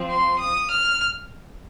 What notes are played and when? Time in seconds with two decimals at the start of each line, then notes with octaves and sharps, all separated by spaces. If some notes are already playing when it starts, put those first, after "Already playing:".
Already playing: F3 C4
0.09 C6
0.40 D#6
0.70 F6